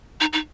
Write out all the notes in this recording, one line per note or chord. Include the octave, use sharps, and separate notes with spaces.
D#4
D#4